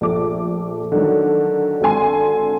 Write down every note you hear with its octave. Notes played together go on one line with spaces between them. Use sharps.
A#1 A3 D6
D3 D#3 F#3
G#1 D3 A4 G#5 C6